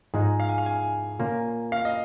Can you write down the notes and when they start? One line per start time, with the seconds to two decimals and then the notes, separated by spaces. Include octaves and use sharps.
0.14 G#2 F3 G#3 D#4 G#4
0.40 F5
0.49 G#5
0.58 F5
0.66 G#5
1.19 A#2 A#3 C#4 F4
1.72 F5
1.85 D#5